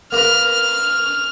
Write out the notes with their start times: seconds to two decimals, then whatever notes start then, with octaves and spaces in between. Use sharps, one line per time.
0.12 A#3 A#4 B4 F6